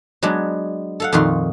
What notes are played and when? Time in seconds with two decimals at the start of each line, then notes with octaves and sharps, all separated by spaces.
0.23 F#3 G#3 B3 D4
1.00 A4 F5 F#5
1.13 F2 A#2 D#3 F#4 F5 C6